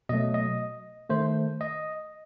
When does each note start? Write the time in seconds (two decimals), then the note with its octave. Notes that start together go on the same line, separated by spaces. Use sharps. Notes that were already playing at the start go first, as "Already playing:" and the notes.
0.09 B2 F#3 A3 D#5
0.34 D#5
1.10 D#3 A3 C5
1.61 D#5